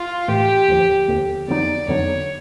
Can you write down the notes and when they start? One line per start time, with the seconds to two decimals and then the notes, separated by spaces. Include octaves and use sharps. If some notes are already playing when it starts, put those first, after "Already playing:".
Already playing: F4
0.28 A2 E3 A3 G4
0.68 D#2 D3 F3
1.08 D#2 D3 F3
1.48 F2 D3 F#3 B3 D#4 D5
1.88 F2 D3 F#3 B3 D#4 C#5